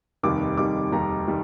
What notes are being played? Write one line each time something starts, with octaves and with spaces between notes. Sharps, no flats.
F1 D#2 D#3 G3 D6
F1 D#2 D#3 G3 D6
F1 D#2 D#3 G3 A#5
D#3 G3